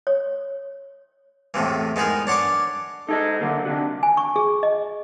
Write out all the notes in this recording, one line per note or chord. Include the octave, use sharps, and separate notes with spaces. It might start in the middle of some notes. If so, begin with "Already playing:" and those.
C#5
E2 A2 C3 E3
G#3 B3 D#4 G#4 A#4
D4 C#5 F#5 C6 D6
D#4 G#4 A4 D#5
D3 F#3 A#3
C3 D4 F#4
G#5
C#6
G#4
D#5